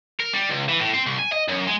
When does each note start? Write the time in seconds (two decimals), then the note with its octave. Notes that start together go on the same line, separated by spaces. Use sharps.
0.20 A#4
0.33 G3
0.50 C#2
0.69 E3
0.80 A2
0.94 C4
1.06 C2
1.19 G#5
1.32 D#5
1.48 F#2
1.67 G#3